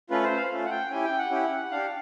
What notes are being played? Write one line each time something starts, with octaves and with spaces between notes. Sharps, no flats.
A3 C#4 F4 B4
C5
F5
A3 C#4 F4
F#5
G5
C#4 E4 G4 G#5
G5
F#5
C#4 E4 G4
D4 G4 F5